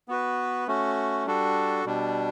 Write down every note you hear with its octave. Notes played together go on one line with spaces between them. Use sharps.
B3 F#4 B4
A3 C#4 F#4
G3 D4 F#4 A4
B2 G3 D4